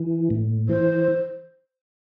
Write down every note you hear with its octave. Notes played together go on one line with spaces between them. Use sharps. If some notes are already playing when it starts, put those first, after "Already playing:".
Already playing: E3
A2
E3 C5